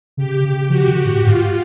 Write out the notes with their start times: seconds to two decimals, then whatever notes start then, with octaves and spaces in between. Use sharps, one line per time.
0.17 C#3 G4
0.44 C#3
0.70 F3 F#4
0.80 C#3
0.88 D3
1.05 A2
1.22 G#2 F4